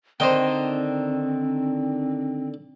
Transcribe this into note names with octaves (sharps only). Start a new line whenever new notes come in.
D3 D#3 C4 C5 D#5 G5